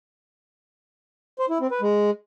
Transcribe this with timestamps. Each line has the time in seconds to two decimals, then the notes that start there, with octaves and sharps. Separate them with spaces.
1.39 C5
1.50 E4
1.60 C4
1.71 B4
1.81 G#3